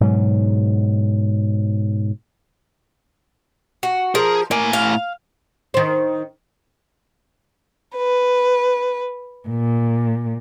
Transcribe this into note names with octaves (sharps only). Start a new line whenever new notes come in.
G#2 B2 F#3
F#4
F3 G#4 A#4
A2 A#3 G#5
F5
D#3 C5
B4
A#2